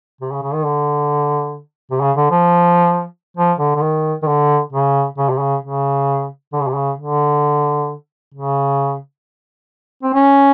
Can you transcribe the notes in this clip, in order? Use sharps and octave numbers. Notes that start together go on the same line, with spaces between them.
C3
C#3
C#3
D#3
D3
C3
C#3
D3
F3
F3
D3
D3
D#3
D#3
D3
C#3
C#3
C3
C#3
C#3
D3
C#3
C3
C#3
D3
C#3
C4
C#4